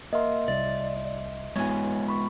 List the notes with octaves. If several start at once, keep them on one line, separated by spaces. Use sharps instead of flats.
A#3 A#4 D#5 E5 C6
C2 D5
G#3 B3 F4 C#5 G#5
B5 C#6